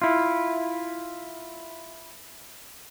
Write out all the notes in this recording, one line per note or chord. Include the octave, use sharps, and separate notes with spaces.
E4 F4